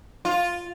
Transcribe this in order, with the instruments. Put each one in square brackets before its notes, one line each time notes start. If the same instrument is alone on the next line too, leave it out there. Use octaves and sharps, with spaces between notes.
[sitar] F4